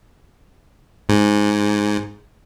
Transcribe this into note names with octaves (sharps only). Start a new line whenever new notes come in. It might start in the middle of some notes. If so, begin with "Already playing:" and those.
G#2